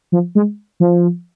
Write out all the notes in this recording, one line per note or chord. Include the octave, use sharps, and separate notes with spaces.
F3
G#3
F3